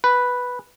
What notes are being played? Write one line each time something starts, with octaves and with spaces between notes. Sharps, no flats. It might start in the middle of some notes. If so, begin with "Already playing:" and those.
B4